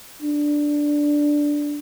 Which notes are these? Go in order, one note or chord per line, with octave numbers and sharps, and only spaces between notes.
D4